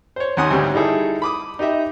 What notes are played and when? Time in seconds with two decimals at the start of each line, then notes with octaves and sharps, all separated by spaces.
0.16 C5 C#5
0.37 D#2 D#3 C#4 F#5 C6 D#6
0.51 D2 G#2 G3 C#4
0.74 G3 D#4 E4 G#4 A4
1.22 B5 D6 D#6
1.59 D#4 G4 D#5 E5